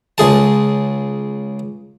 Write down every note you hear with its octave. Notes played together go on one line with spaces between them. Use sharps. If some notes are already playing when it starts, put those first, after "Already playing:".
C#2 G#4 A5